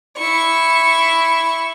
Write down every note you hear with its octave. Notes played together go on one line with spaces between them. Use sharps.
E4 C#6